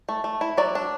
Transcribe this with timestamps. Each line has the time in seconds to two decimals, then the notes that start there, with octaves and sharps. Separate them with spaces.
0.09 A3
0.24 A3
0.41 E4
0.58 F#3 D5
0.75 D4